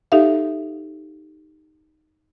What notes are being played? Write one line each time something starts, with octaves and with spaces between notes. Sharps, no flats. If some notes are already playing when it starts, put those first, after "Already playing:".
D#4 G4 A4 E5 F5